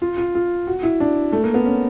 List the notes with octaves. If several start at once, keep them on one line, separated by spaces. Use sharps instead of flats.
F4
F4
F4
F#4
E4
D4
A3
A#3
B3
C#4